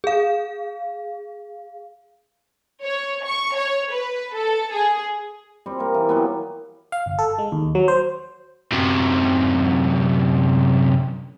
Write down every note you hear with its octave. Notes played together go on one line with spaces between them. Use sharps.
G#4 F5
C#5
C#6
C#5
B4
A4
G#4
G3 C4
A#3 A#4
E3
F#3 G3 B3
F5
G1
A4
G#3
D#2
F#3
C5
F#2 C3